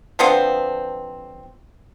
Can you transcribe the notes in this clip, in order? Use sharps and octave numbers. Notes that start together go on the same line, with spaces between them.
D3 F3 B3 C4